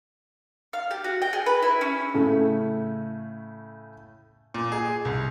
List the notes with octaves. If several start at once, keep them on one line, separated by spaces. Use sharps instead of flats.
F5
G4
F#4
G5
G#4
B4
E4
C#4
A2 C#3 A3
A#2
G#4
C2